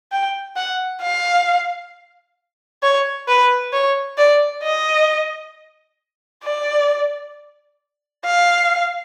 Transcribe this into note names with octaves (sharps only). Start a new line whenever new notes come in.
G5
F#5
F5
C#5
B4
C#5
D5
D#5
D5
F5